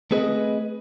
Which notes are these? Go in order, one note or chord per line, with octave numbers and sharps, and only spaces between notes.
A3 C4 G#4 B4 D5 D#5